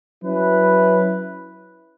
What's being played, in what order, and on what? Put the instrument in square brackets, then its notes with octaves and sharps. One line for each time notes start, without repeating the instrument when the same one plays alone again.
[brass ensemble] F#3 C#4 E4 B4